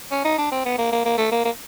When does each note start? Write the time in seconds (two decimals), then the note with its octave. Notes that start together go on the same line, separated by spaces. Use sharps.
0.12 C#4
0.25 D#4
0.38 D4
0.51 C4
0.65 B3
0.78 A#3
0.92 A#3
1.05 A#3
1.18 A3
1.31 A#3
1.45 A#3